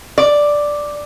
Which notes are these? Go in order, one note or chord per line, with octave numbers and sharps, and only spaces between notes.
D5